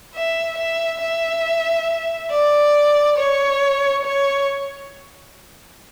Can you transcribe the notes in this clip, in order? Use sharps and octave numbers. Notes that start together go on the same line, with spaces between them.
E5
E5
E5
D5
C#5
C#5